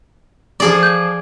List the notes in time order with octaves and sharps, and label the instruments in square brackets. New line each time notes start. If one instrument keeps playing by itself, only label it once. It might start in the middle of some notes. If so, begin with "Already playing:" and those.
[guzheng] F3 G#4 D5
[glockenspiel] G6